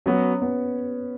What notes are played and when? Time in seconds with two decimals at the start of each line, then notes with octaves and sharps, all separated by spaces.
0.06 F#3 B3 C#4 F#4
0.42 B3